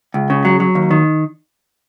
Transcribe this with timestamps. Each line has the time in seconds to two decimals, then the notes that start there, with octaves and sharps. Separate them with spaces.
0.14 C#2
0.30 C#3
0.45 F#3
0.60 F#3
0.75 D#2
0.91 D#3